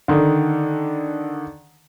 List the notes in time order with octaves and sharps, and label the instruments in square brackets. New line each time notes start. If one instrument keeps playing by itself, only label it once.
[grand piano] D3 D#3